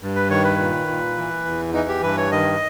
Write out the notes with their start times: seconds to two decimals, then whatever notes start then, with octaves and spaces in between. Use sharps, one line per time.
0.02 G2
0.15 B4
0.30 D#3 C#5
0.44 B4
0.58 A#2
0.88 A#2
1.17 E3
1.45 E2
1.73 E3 D#4
1.89 G4
2.03 G2 B4
2.17 C#5
2.31 D#3 D#5